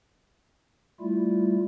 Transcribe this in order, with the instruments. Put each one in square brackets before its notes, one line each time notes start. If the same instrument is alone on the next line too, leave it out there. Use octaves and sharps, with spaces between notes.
[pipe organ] G3 A3 E4 F4